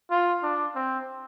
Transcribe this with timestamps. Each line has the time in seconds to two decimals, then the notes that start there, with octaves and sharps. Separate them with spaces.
0.11 F4
0.43 D4
0.75 C4